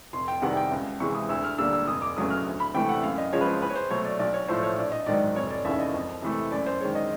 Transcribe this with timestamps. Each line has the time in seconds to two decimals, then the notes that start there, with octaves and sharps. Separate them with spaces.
0.13 F1 C6
0.28 G5
0.42 E2 C3 D#3 G3 F#5
0.57 G5
0.72 C#2
1.00 C3 E3 G#3 C#6
1.15 D#6
1.29 D2 E6
1.44 F6
1.58 D3 G3 A#3 E6
1.73 E6
1.88 F1 D#6
2.02 D6
2.16 E2 C#3 F#3 A3 D#6
2.30 F6
2.45 D2
2.60 B5
2.74 C3 E3 A3 G5
2.89 F#5
3.03 F#2 F5
3.18 D#5
3.32 C#3 F3 G#3 C#5
3.41 B4
3.47 C5
3.62 E2 B4
3.70 C#5
3.76 C5
3.90 B2 F#3 A3 C#5
4.05 D5
4.19 B1 D5
4.34 C#5
4.48 A2 F3 A3 C5
4.63 C#5
4.78 A#1 D5
4.92 D#5
5.06 G#2 D#3 F#3 D5
5.36 F1 C#5
5.50 D5
5.65 D#2 C#3 E3 E5
5.79 D#5
5.94 F2
6.22 C3 E3 A3
6.51 F#2 D5
6.67 C5
6.81 D#3 G#3 C#5
6.95 D#5